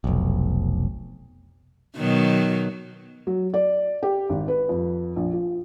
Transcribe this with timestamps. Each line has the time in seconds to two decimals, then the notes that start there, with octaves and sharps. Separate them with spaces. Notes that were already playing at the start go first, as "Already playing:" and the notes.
0.04 F1 B1
1.97 B2 D#3 F#3
3.27 F#3
3.54 D5
4.03 G4
4.29 G#1
4.48 B4
4.69 F2
5.16 A#1
5.33 F3